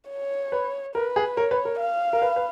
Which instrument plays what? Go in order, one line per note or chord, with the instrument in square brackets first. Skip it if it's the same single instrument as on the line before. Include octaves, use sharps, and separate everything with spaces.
[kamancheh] C#5
[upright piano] B4
[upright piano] A#4 [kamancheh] B4
[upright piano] G#4
[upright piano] A#4 [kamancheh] C#5
[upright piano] B4
A#4
[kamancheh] F5
[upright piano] A#4
B4
B4